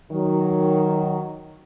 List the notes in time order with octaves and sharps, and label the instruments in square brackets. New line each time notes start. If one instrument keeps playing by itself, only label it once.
[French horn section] D#3 F#3